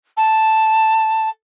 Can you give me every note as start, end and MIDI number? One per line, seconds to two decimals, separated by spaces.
0.17 1.28 81